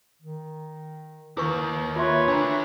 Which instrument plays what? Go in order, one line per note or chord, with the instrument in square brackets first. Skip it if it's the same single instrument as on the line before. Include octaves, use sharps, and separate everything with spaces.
[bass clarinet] D#3
[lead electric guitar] D#2 [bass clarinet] D#3 [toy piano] E4 B4 C#6
[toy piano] F4 E5 C6 [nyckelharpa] B4 C#5
[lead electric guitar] D3 A3 [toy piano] D4 A#5